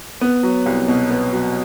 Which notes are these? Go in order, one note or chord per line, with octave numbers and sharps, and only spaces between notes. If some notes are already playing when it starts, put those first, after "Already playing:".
B3
F#3
C2
B2
B3
F#3